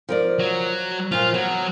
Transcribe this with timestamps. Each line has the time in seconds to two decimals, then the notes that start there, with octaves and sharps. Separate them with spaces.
0.09 F3 A#4 D5
0.39 F#3
1.12 A#2 F3 F4
1.34 F#3 B3